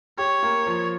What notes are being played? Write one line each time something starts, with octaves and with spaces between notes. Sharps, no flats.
G4 C#5
A#3
F3